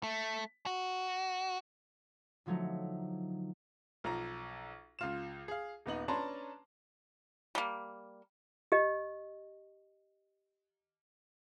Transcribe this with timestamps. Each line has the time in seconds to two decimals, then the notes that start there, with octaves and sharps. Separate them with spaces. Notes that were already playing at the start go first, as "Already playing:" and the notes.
0.03 A3
0.66 F#4
2.46 D3 F3 F#3 A3 D#4
4.04 B1 F3 A#5
4.99 C#2 F4 E7
5.48 G#4 F5
5.86 D#1 B3 D#4 F#7
6.08 C#4 D4 B4 A5 A#5 C6
7.55 G3 A#3
8.72 G4 D#5